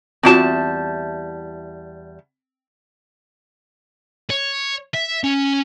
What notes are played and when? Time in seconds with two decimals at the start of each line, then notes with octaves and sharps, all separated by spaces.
0.23 E2 G3 C4 F4 F#4 A5
4.30 C#5
4.94 E5
5.24 C#4